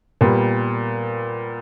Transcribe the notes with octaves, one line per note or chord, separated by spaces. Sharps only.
A#2 G3 B3